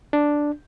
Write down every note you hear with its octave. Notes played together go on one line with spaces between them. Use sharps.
D4